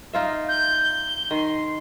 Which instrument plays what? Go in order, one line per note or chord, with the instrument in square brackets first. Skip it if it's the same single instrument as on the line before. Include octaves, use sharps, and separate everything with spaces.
[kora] D#4 F4 E5
[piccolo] G6
G7
[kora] D#3 [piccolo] C6